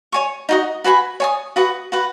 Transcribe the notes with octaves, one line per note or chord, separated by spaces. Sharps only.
C#5 G#5 C#6
D#4 F#4 D#5
F#4 B4 G#5 B5
C#5 G#5 D#6
F#4 B4 F#5 D#6
F#4 B4 F#5